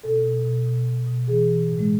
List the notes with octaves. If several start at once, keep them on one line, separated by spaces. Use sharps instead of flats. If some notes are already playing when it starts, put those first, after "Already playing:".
B2 A4
B2
B2
B2
B2
B2
E3 G#4
E3
A2
G#3